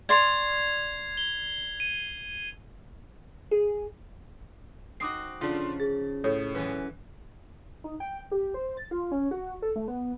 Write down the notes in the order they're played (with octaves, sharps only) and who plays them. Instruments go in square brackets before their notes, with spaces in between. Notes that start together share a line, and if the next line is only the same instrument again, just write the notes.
[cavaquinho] D5 C6 C#6 [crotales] G#6 C7 F7
[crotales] G7
D#7
[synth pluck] G#4
[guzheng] C4 D#4 F#4 [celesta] D6 D#6 C7
[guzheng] C#3 F3 [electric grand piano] D4 F4
[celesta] G#4 [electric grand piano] A6
[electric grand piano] A2 [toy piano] A4 C#5
[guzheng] F#2 E3 [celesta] B4
[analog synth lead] D#4
G5
G4
C5
A6
F4
C#4
F#4
A4
A3
B3